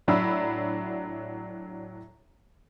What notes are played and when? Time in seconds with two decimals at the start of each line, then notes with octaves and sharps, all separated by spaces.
0.08 A2 F#3 D4 E5 B5 E6